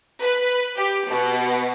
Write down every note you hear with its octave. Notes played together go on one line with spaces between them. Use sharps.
B4
G4
B2